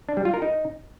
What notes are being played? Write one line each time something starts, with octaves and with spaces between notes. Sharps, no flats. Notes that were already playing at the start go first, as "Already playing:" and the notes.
D4
G3
F4
A#4
D#4